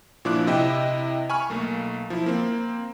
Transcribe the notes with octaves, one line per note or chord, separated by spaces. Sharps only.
A#2 F3 D4 E4 D6 F#6
C3 E4 D#5 E5 G5
G#5 B5 C#6 F6
B1 A3 A#3
F3 E4
A#3 C4